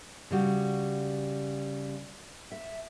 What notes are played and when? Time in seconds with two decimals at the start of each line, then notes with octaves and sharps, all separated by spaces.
0.31 C#3 G3 F#4
2.52 E5